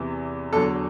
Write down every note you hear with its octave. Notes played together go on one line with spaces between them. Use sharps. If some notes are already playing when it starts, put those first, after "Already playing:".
Already playing: E2 C3 E3
E2 D3 F#3 A4